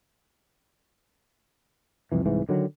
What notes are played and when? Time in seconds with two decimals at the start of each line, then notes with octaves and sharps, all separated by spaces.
2.12 C2 F2 E3
2.26 C2 G#2 E3
2.49 D3 D#3 F#3